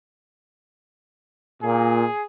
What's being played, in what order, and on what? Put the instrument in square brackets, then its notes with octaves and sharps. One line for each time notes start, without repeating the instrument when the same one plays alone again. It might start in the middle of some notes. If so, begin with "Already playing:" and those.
[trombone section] A#2 [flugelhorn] G#4